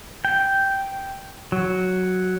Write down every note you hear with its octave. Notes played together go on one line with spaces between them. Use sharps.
G5
F#3